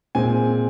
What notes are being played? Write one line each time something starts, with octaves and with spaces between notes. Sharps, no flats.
A#2 G#3 C4 G#5